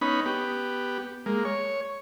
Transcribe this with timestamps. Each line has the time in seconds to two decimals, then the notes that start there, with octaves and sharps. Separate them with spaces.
0.01 B3 C#4 D#4 B5
0.26 B3 G4
1.26 G#3 A#3
1.45 C#5